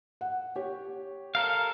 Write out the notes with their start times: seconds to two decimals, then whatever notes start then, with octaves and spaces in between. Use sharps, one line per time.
0.21 F#5
0.56 G4 C#5
1.35 A4 A#4 F5